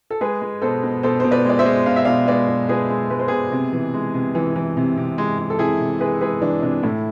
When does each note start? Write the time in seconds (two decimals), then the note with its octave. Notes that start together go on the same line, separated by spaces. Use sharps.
0.10 A4
0.21 G#3 G#4 B4
0.41 G#3
0.62 B2 A4 C5
0.83 B2
1.03 B2 A4 C5
1.20 B2 C5
1.31 B4 D5
1.45 G#3 D5
1.59 C5 E5
1.65 G#3
1.86 B2 F5
1.96 E5
2.05 B2 D5 F5
2.27 G#3 B4 D5
2.48 B2
2.69 G#3 G#4 B4
2.90 G#3
3.10 G#3 B4
3.19 C5
3.28 B2 G#4 B4
3.52 C3
3.73 E3
3.94 G#3
4.14 C3
4.35 E3
4.56 E3
4.77 C3
4.97 C3
5.18 G#3
5.38 G#3
5.50 A4
5.58 C3 E4 G#4
5.80 C3
6.00 G#3 G#4 B4
6.21 G#3 G#4 B4
6.41 E3 D4
6.62 C3 D4
6.83 A2 E4